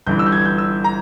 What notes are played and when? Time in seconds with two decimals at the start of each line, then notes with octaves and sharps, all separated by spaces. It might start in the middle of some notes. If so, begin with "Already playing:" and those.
0.06 G1 G2 E3 G6
0.19 E6
0.26 G6
0.32 G#6
0.45 G6
0.58 E6
0.84 A#5